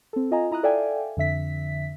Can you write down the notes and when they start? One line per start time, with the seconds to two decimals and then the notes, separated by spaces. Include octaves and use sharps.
0.13 C4 A4
0.31 F4 D#5 G#5 A#5
0.51 E4 A#5 D#6 F#6
0.63 A4 D5 E5 F5 G5 G#5
1.17 F2 D3 E5 B6